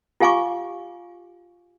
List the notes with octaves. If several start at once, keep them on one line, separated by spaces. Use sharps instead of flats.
F4 G4 F5 G#5 C#6 D6